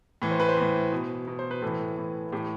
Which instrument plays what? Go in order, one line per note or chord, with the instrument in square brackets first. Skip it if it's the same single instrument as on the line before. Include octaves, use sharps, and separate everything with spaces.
[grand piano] A2 E3
C5
B4
C5
A2 E3
B2
B2
C5
B4
A2 E3 A4
A2 E3
A2 E3 G4